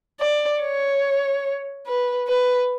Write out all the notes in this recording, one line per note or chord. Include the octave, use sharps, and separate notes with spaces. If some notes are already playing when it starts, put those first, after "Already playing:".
D5
C#5
B4
B4